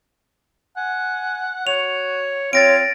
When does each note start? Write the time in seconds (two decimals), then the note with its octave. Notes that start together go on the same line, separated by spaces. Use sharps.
0.77 F#5 G#5
1.67 F#4 C#5 F7
2.53 C4 F4 C#5 A6 A#6 D7